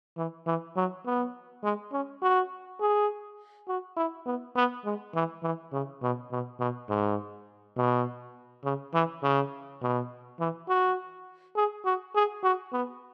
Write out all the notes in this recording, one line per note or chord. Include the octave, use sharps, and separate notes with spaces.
E3
E3
F#3
B3
G#3
C#4
F#4
G#4
F#4
E4
B3
B3
G#3
E3
E3
C#3
B2
B2
B2
G#2
B2
C#3
E3
C#3
B2
E3
F#4
G#4
F#4
G#4
F#4
B3